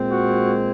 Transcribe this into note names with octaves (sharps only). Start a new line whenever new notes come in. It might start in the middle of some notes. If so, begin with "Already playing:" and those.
Already playing: A#2 G#3 C4
F#4